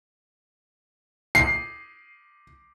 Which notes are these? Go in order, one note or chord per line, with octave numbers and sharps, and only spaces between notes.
C7